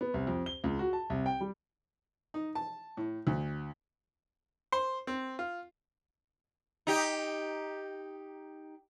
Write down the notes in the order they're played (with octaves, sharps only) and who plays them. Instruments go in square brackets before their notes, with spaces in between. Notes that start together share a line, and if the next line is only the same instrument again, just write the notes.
[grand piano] B3
C2
F2
G7
C#2
F#4
A5
C2
G5
G3
[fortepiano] D#4
A5
A2
D2
C5
C4
F4
[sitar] D#4 G4